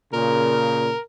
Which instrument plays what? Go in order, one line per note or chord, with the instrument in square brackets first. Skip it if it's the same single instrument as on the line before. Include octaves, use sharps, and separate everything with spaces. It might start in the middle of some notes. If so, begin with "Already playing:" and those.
[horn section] A#2 C#3 [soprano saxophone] A#4